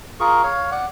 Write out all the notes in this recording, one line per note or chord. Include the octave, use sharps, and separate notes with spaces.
F4 G#4 A#4 C#6
C#5 F5
D5 F#5